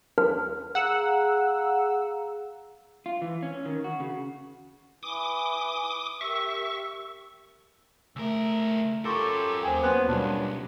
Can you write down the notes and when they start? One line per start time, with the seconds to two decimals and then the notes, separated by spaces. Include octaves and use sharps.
0.18 B4
0.75 G#4 F5 F#5 A#5 E6
3.06 F4
3.22 E3
3.43 C#4
3.66 D#3
3.84 F#4
4.00 C#3
5.03 E4 B4 G#5 D6 D#6
6.21 G4 A#4 E5 C#6 E6
8.16 C#2 A3 A#4 E6
9.05 C#4 F4 G4 A4 A#4 C6 C#6
9.63 D#2 G4 G#4 C5 G5
9.83 F#3 B3 C5 C6 F#6
10.09 B1 G2 A#2 G3 C#4 A5